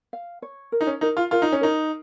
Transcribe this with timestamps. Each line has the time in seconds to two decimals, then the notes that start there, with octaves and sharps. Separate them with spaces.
0.13 F5
0.42 C#5
0.72 A#4
0.81 D#4
0.87 C#4
1.01 D#4 A#4
1.17 F4
1.31 F4 A#4
1.42 D#4
1.52 C#4
1.61 D#4 A#4